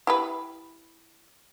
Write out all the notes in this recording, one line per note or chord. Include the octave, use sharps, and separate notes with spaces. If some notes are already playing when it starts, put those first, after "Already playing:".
E4 G4 B4